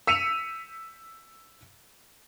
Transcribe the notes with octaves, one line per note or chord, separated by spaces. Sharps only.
E6 B6 C#7 D#7 F7